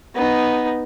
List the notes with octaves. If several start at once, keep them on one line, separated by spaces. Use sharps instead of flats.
B3 D#4